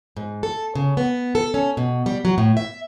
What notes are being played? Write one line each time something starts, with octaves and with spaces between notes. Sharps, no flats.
G#2
A4
C#3
B3
A4
C#4
B2
G3
F#3
A2
E5